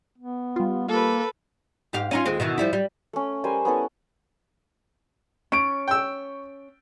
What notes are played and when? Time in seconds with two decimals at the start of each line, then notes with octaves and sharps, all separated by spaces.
0.19 B3
0.56 G3 F4
0.89 A#3 A4 B4
1.93 G#2 G4 F5
2.11 C#4 D#4 F4
2.26 D#2 G#3 C4
2.40 B2 D#3 E3
2.58 F3 G3 E4
2.73 G3
3.13 A3 C#4
3.44 G3 A#4 C5 G#5
3.65 B3 C#4 E4 A4
5.52 C#4 C#6 D7
5.88 G5 E6